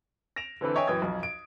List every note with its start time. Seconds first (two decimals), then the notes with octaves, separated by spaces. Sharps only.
0.36 A#6 D7 E7 F7
0.61 D3 E3 C4 A4 B4
0.76 C#5 D#5 E5 G5 G#5 D#6
0.87 F#2 E3 G5 D#6 G#6
1.02 B1 F2
1.23 D7